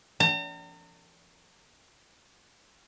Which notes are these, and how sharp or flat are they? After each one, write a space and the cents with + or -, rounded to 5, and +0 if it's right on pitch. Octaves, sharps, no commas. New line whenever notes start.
A#5 -45